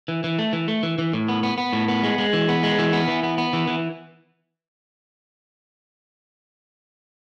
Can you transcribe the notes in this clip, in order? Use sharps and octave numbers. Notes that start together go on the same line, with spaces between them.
E3
E3
A3
E3
A3
E3
E3
A2
B3
B3
B3
A2
B3
G#3
G#3
E3
B3
G#3
E3
B3
E3
B3
B3
E3
E3